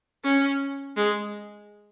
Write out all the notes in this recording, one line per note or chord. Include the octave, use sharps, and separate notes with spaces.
C#4
G#3